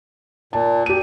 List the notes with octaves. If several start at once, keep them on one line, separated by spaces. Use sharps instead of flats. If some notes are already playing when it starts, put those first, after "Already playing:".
A#2 A5
G4 D#7